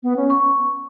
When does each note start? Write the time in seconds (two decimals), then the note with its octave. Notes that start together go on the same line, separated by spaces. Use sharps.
0.03 B3
0.16 C#4
0.30 C#6